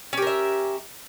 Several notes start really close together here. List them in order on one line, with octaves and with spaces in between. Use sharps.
C#4 G4 A#4 E5